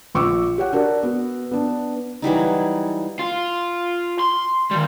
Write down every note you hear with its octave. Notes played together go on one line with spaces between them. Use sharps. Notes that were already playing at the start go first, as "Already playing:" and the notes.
A#1 C#6 D6 E6 C#7
G4 C#5 F#5
D4 F#4 A#4 D5
B3 F#4
B3 D4
E3 F#3 G3 D#4
F4
C6
D#3 G3